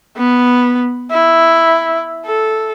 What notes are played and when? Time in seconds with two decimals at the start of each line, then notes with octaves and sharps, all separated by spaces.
0.17 B3
1.11 E4
2.25 A4